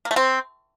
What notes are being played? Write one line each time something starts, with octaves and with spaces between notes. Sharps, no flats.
A#3
A3
C4